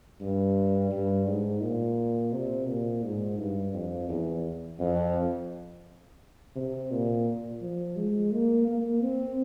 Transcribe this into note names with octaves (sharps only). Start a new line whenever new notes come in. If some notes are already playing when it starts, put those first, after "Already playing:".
G2
G2
G#2
A#2
C3
A#2
G#2
G2
F2
E2
F2
C3
A#2
F3
G#3
A#3
A#3
C4